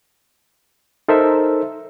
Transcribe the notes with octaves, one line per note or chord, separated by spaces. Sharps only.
D#4 A4 A#4 C5 E5